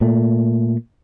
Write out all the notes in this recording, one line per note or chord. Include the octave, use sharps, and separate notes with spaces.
A#2 A3